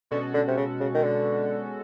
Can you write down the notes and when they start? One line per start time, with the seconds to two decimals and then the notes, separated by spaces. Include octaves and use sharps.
0.11 B2 D3 G#3 C#4 F#4 A4
0.34 D3
0.47 C3
0.57 C#3
0.80 C#3
0.94 D#3
1.03 D3